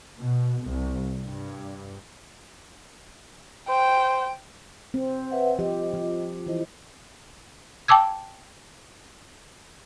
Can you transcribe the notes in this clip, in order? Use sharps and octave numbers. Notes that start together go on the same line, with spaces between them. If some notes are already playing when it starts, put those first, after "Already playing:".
B2
C2
G2
C5 G5
C4
B4 E5 F#5
F3 G4 D#5
F3
E3 E4 C5 D#5
G5 A5 D6 E6 G#6